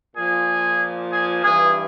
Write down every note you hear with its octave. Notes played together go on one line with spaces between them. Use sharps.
A#2 F3 G#4
G#4
G2 E3 G#4